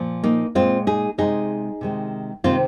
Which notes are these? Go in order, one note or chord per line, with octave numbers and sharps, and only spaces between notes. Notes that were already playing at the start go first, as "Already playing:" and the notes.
Already playing: A#2 F3
A#3 D#4
A#2 G#3 C4 F4
D#4 G#4
C3 G#3 D#4 G#4
C3 D#3 G#3
C3 D#3 G#3 C4 F4